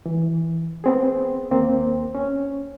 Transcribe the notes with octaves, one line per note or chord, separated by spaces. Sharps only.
E3
B3 C4 G#4
D#2 A#3 C4
C#4